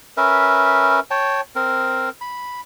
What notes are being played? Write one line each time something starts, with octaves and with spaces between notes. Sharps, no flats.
C#4 A#4 B4 E5
C#5 G5 A5
C4 A#4
B5